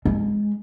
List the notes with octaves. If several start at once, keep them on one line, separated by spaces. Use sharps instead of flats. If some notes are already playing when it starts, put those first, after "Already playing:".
G#3